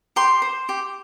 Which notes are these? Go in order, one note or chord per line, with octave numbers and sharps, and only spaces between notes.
G4 C6
C5
G4